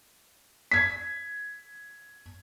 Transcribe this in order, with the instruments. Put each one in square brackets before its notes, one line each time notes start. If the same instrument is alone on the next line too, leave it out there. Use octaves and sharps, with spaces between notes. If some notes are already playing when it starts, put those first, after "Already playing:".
[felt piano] G#6 B6